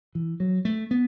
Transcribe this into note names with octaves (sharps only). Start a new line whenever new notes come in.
E3
F#3
A3
B3